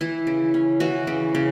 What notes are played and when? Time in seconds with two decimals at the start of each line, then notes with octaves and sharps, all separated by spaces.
0.01 E3 E4
0.27 C#3
0.54 C#4
0.80 E3 F#4
1.07 C#3
1.35 C#3